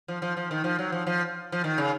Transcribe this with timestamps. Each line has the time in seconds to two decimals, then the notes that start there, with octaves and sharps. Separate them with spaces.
0.08 F3
0.22 F3
0.37 F3
0.51 D#3
0.64 F3
0.79 F#3
0.92 F3
1.07 F3
1.52 F3
1.64 D#3
1.78 C#3